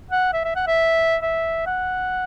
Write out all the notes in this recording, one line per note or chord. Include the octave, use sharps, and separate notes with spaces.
F#5
E5
E5
F#5
E5
E5
F#5